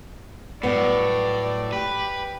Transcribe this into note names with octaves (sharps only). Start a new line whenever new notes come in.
A2 F#3 G3 B3 D5
G4 B4